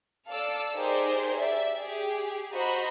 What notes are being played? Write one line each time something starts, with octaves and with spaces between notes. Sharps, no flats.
A4 D5 F5 D6 E6
D#4 G4 G#4 A#4 C5 D5
D5 E5
G4 G#4
F#4 C5 D#5 A#5 B5